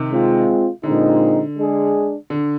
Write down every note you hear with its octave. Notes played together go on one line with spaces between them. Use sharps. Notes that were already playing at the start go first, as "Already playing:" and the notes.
Already playing: C3 D#3
G#3 C4 F4
A#2 D3 G#3 C4 D#4
G#3 D4 G#4
D3